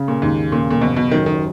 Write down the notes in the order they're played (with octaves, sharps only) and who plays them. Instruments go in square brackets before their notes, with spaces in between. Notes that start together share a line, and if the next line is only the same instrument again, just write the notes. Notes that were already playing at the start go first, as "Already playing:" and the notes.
Already playing: [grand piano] C#3
[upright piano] A#2
[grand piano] D#2 [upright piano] G#2
[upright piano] A#2 [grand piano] C#3
[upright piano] A#2
[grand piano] F#1 [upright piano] B2
[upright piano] B2
[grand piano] F#2 [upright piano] D#3
[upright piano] D#3